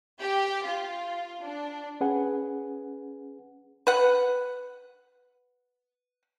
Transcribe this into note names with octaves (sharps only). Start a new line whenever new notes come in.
G4
F4
D4
C#4 G#4 B4 F#5 G#5
B4 F#5